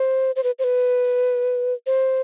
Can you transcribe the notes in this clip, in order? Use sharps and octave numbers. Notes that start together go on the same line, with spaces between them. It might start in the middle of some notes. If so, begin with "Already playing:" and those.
Already playing: C5
C5
B4
C5
B4
C5